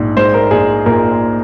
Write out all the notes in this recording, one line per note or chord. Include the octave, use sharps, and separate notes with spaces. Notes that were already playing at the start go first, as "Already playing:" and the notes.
Already playing: A#1 G#2
G#3 C5
A#4
A#1 G#4
A#2 A#4